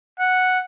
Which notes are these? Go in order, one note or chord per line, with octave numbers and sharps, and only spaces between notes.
F#5